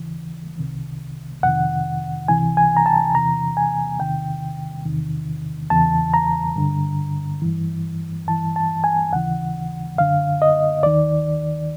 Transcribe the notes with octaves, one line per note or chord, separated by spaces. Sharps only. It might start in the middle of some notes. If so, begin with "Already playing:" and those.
Already playing: D#2 C#3 E3
C2 C3 D#3
F2 C3 D#3 F#5
C#2 C3 E3 G#5
G#5
A#5
A5
E2 C3 E3 A#5
G#5
E2 C3 D#3 G5
E2 C3 D#3
E2 C#3 E3 A5
A#5
G2 D3
G2 E3
G2 E3 A5
A5
G#5
D#2 C#3 E3 F#5
F#2 D3 F5
D#5
D#2 D#3 D5